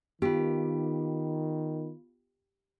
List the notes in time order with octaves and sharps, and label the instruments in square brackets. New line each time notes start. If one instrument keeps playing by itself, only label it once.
[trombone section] D#3 [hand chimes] B3 F4 [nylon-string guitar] G4